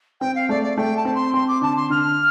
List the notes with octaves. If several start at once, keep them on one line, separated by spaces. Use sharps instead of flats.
C4 G5
F5
A3 D5
D5
A3 G5
A5
C4
C6
C4 C6
D6
D3 A5
C6
D3 F6